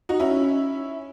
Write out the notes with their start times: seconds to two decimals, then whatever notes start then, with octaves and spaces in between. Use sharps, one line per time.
0.09 D#4 F#4
0.20 C#4 E4